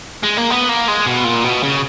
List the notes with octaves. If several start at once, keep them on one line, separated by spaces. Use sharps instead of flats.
G#3
A#3
B3
A#3
G#3
B2
A#2
B2
C#3